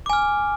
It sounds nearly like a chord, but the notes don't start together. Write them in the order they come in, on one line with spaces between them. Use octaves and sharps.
D6 G#5 F6